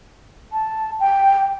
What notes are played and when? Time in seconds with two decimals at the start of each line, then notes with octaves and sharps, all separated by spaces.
0.52 A5
1.00 G5